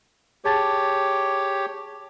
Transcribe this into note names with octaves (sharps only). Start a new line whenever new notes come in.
G4 G#4 C#5 A5 A6